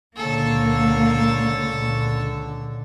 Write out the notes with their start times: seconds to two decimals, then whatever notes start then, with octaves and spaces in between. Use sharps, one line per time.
0.17 C#2 A#2 D3 A#3 A4 C#5